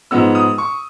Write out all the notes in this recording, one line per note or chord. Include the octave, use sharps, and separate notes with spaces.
G#2 F3 G#3 B3 E6
D#6
C#6